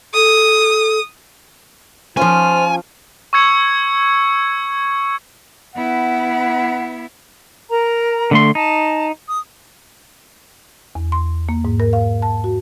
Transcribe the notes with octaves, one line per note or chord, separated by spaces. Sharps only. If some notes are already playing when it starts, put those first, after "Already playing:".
A4 D#6
F3 C#4 F4 C5 G#5
C#6 E6 G#6 C#7
B3 E4 F#5
A#4 A#5
D3 A3 C6
D#4 A5
D#6
E2
C6
A#3
G#2
A#4
F5
A5
F#4